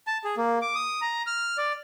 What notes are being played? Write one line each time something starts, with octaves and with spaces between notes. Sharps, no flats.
A5
G#4
A#3
D6
D#6
A#5
F6
D5